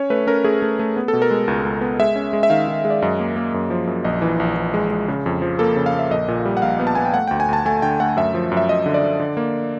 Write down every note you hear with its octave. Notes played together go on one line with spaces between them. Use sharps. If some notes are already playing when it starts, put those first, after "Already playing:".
Already playing: C#4 C#5
A3 B4
C#4 A#4
A3 G#4
A3
A3
B3
A4
B2
A#4
G#3
C#2
C#2
B3
G#3 E5
C#4
G#3
E5
D#3 F5
D#3
G#3
D5
F#2 D#5
A#3
A#3
F#2
F3
F#2
A#1 D#5
E3
A#1
E3
G#3
G#3
C#3
F2
F3
A#3 A4
C#3
F5
A#3
E5
A#1 D#5
A#2
G3
F#5
A#1 F5
B3
A5
B3 G#5
G5
A3 F#5
D2 G5
G#5
D2 A5
A3 G#5
D3 G5
A3 F#5
F#2 E5
F3
F#2
E5
F#2 D#5
D3
D5
D3
D3
A#3